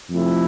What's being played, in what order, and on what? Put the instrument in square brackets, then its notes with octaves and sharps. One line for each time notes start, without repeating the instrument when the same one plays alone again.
[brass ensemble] F2 C3 F3 A3 E4